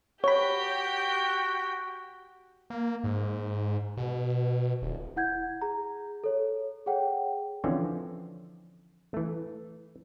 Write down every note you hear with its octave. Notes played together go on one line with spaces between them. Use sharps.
F#4 G4 C#5 G5 B5
A#3
G#2
B2
D#1
E4 F#5 G6 G#6
G#4 A#5
A4 C#5
G#4 C#5 F#5 G5
D3 E3 F3 C4 C#4
E3 A3